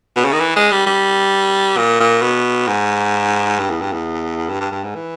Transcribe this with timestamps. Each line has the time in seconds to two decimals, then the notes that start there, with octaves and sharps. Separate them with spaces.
0.17 B2
0.25 C#3
0.33 D#3
0.40 E3
0.56 G#3
0.71 G3
0.86 G3
1.77 A#2
2.00 A#2
2.22 B2
2.68 G#2
3.59 G2
3.70 E2
3.81 G2
3.93 E2
4.49 G2
4.61 G2
4.72 G2
4.84 G#2
4.95 E3